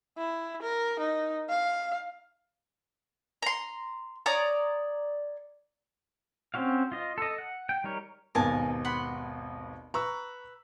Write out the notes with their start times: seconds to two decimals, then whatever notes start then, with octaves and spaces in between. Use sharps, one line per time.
0.18 E4
0.62 A#4
1.00 D#4
1.50 F5
3.42 A#5 C6
4.26 C#5 D5 A#5 D#6
6.54 C4 C#4 F#4 F5
6.92 F4 D#5
7.18 A4 D#5
7.38 F#5
7.69 G5
7.84 G3 D#4 A#4 C#5
8.35 G#1 D#2 B2 A#4 G#5 A5
8.85 F#5 B5 C6
9.94 B4 A#5 C#6 E6